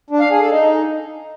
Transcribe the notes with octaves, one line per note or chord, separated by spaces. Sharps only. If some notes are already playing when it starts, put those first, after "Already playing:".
D4
F5
G#4
A4
D#4